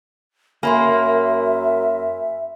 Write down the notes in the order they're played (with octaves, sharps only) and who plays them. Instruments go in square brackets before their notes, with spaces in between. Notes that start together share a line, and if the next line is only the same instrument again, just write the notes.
[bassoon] F#2 [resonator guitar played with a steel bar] A#3 [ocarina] E5 [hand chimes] G#5 B5 C6